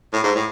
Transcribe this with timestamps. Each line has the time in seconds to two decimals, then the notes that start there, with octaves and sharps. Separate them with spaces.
0.13 A2
0.24 G#2
0.35 A2